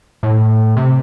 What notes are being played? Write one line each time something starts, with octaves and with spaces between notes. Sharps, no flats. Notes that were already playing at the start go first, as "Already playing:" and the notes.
A2
C3